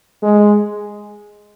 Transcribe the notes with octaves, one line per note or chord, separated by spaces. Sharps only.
G#3